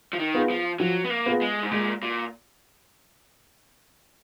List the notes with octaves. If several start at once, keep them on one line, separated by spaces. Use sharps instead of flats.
F3
D#3
B3 F4 G#4
F3
F3 F#3
B3
A#3
B3 F4 G#4
G#3
G#2
A#2 G#3
A#2